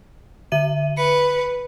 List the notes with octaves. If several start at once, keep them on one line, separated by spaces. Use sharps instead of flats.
D3 E5 D#7
B4 C#7